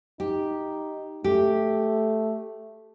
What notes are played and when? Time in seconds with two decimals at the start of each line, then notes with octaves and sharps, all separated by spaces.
0.20 D#4 G4
1.24 A3 G4